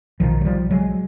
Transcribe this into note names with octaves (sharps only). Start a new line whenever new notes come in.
B1 B2 D#3 F3
F#3
F3 G3
F#3 G#3